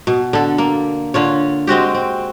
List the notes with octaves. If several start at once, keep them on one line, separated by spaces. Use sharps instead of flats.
B2
D3 A4
A#3
D3 F4 C#5
G#3 C4 F#4 G4
C4